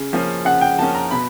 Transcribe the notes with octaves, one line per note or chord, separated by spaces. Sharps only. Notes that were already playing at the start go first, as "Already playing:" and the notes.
Already playing: C#3
F3 A#3 C#4
C#3 F#5
G5
F3 A#3 C#4 A5
A#5
B2 B5